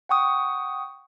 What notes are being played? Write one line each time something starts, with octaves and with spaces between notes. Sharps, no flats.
F#5 G5 C#6 D#6